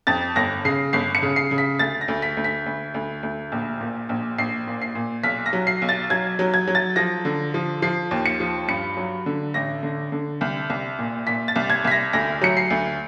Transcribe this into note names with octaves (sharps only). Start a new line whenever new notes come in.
F2 A6
G1 A#6
C#3 C7
G1 C7
C#7
C#3
C7
C#3
B6
D2 A6
A#6
D2
B6
D2
B6
D2
D2
D2
A#1
A#2
A#1
A#1 C7
A#2
C7
A#2
B1 B6
A#6
F#3
C7
B1
A6
F#3 G#6
F#3
G#6
F#3
A6
F3 A#6
D3
F3
F3 C7
D#2
C#7
F3
G2 C#7
F#3
D3
A1 A#6
D3
D3
C2
C2
A#2
A#2 B6
A6
C2
G#6
C2 B6
A#6
D2 A#6
F#3 C#7
C7
D2